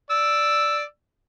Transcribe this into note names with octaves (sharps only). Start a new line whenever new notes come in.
D5 E6